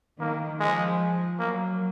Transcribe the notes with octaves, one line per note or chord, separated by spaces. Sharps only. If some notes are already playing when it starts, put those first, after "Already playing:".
D#3 A#3
F3 G#3
F#3 A#3